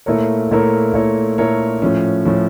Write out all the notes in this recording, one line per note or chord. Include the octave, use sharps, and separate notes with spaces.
A#2 A3 E4 A#4 C#5
A#2 A3 E4 A#4 C#5
A#2 A3 E4 A#4 C#5
A#2 A3 E4 A#4 C#5
A2 F3 C#4
A2 F3 C#4